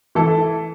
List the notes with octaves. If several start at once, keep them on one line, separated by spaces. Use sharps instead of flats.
E3 A4